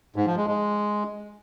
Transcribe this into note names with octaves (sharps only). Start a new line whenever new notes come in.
G#2
F3
G#3
G#3